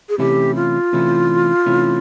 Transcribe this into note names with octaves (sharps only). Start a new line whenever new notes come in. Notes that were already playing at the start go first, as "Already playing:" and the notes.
G#4
C3 E3 A3 C#4 E4 G4
F4
C3 E3 A3 C#4 E4
C3 E3 A3 C#4 E4